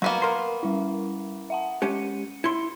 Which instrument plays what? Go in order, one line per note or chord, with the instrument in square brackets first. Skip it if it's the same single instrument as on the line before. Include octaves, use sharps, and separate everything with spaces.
[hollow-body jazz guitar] F#3 [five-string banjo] A#3 B3 F#4
[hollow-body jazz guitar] A#4 C6
[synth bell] G3 E4
E5 F#5 A5
[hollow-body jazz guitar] G#3 C#4 G4 [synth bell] C#7 D#7
[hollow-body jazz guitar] E4 C6 [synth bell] C#7